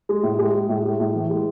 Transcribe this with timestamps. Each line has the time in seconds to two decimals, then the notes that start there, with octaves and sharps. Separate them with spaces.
0.09 G#3
0.23 A2
0.39 G#3
0.54 G#3
0.69 A2
0.85 G#3
1.00 A2
1.15 E3
1.30 G#3